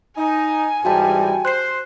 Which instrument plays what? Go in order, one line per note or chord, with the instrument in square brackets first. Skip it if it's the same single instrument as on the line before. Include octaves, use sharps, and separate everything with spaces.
[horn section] D#4 [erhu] G#5
[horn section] G#2 E3 G3 [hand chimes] F#4 G5 A5
[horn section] C5 [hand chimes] F#6 C7